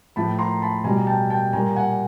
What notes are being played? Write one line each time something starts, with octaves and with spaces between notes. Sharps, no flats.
A2 F3 A5 B5
A#5 C6
A5 B5
B2 G3 G#5 A#5
G5 A5
G5 A5
A#2 G3 G#5 A#5
F#5 G#5